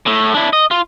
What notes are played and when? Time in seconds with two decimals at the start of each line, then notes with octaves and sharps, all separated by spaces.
0.06 A2 A3
0.34 D4 E4
0.53 D#5
0.71 F4